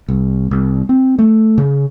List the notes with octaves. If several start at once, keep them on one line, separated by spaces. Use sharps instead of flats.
C2
C2
C4
A3
C#3